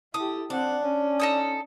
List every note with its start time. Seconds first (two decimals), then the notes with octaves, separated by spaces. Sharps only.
0.14 E4 G4 A4 D#6
0.50 C4 D4 F#5
0.82 C#4
1.20 D#4 A4 D#6